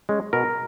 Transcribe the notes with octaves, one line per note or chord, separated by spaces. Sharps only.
G#3 C#4
B2 A#4